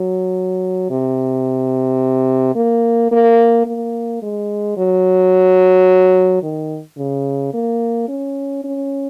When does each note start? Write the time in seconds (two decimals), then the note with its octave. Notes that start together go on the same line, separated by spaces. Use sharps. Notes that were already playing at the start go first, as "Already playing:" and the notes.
Already playing: F#3
0.90 C3
2.55 A#3
3.11 A#3
3.66 A#3
4.22 G#3
4.77 F#3
6.43 D#3
6.98 C#3
7.54 A#3
8.09 C#4
8.64 C#4